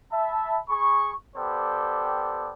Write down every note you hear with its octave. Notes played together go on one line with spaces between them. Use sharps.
E5 A5 B5
G#4 B5 C#6
B3 G4 A4 C5 D5 G5